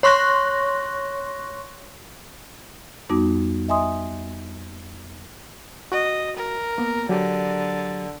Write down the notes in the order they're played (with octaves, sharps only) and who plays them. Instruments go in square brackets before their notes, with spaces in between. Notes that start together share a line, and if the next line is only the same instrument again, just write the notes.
[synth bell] C#5 C6 C#6 F#6 A#6
[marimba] F2 G3 B3 D#4 F#4 D6
D#5 E5 G#5 C6 D#6
[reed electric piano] F#4 [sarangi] D#5
[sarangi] A#4
[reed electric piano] A#3 B3
[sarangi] D3 [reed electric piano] F#3 G4